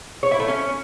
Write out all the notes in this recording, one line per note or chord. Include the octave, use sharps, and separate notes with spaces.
C#5
E4
A3
C#4